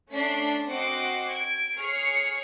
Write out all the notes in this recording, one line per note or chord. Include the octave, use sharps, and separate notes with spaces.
A3 C#4 D4 B6 C7
C4 F#4 D#5 F#5 D6 C7
G#6 D7
G#4 C#5 C#6 F6 C7 C#7